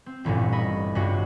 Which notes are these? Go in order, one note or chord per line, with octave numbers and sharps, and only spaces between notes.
C4
D#1 A1 G2 A#2
D#5 B5 C#6
C#2 G2 F#4